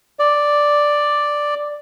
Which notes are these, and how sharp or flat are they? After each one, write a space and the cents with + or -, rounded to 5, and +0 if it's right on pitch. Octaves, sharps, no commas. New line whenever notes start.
D5 +0